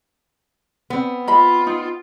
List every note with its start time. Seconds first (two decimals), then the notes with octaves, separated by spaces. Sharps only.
0.90 B3 C4
1.28 F4 D#5 B5
1.67 D#4